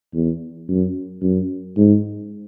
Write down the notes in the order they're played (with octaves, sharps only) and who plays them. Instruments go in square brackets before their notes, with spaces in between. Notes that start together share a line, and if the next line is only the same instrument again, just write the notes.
[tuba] E2
F#2
F#2
G#2